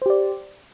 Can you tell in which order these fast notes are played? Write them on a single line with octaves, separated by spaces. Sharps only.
C5 G4 D5